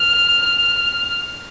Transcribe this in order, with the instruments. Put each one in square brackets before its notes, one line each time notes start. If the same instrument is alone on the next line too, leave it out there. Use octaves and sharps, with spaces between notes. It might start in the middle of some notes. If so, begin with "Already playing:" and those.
Already playing: [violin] F6